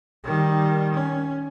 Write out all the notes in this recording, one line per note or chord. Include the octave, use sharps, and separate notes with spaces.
D#3 G3
C#4